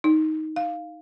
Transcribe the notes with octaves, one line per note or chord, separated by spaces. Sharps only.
D#4
F5